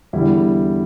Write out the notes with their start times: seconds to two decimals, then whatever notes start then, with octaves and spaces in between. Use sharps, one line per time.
0.13 E2 D3 G3 E4